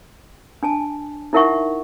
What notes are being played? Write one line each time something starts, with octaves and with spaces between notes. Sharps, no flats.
D4 G#5 A5
D#4 E4 A#4 E5 F#5 C#6